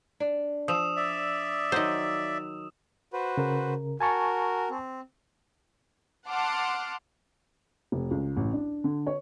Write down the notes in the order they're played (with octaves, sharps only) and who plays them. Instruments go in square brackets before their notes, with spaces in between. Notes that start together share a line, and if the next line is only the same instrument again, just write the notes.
[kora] D4
[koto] F3 [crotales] D#6 E6 E7
[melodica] D5 E5
[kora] D#3 F#3 [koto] C5 D#5
[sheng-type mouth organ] F#4 B4 C5
[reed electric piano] C#3 A#4
[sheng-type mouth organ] F#4 A#4 [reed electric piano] G#5 A5 C#6
[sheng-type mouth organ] C4
[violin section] F#5 A5 C6 D6 F6
[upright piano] F1
C#2
A1
D4
D3
C#5